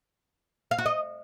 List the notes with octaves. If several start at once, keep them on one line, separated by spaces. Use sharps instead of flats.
F5
F#4
D#5